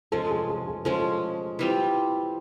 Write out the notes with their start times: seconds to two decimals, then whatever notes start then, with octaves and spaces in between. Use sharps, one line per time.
0.12 F3 G#3 C#4 A4
0.30 G#4
0.49 G#4
0.67 G#4
0.85 F3 G#3 C#4 A4
1.59 E3 G3 C4 F4